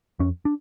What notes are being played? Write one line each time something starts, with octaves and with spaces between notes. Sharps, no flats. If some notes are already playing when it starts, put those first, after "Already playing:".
F2 C#4
D4